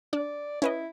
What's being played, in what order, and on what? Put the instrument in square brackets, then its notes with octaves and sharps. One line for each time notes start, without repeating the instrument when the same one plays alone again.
[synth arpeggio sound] D4 [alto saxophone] D5
[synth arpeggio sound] C#4 B4 D#5 [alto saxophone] E4